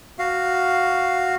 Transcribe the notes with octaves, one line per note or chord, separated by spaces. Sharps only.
F#4 F5